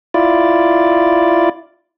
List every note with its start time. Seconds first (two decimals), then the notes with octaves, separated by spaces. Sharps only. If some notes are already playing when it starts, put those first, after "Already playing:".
0.14 E4 F4 D5